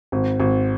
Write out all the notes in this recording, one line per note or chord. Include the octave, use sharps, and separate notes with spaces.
G#1
G#1